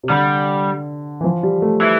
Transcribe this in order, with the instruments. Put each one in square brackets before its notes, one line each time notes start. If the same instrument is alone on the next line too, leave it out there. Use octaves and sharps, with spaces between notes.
[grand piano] C3
[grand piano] D3 [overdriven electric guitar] G3
[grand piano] E3
F3
G3
A3
[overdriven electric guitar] E3